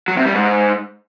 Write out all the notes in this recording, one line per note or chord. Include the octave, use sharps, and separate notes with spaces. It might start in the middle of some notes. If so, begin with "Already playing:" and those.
F#3
C3
G3
G#2